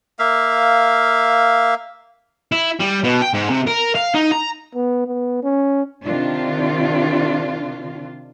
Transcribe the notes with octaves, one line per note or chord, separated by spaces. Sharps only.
A#3 E5 F5
E4
G3
B2
G5
G#2
C3
A#4
F5
D#4
A#5
B3
B3
C#4
C3 D#3 D4 F4